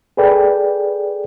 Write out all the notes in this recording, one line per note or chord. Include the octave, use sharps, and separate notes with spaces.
G#4 A4 B4 D5 G5